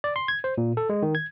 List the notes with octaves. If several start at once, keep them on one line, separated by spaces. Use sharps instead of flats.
D5
C6
G#6
C5
A#2
A4
G#3
D#3
G#6